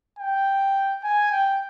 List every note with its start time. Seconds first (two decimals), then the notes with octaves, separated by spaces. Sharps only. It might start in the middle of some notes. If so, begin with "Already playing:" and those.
0.19 G5
1.04 G#5
1.31 G5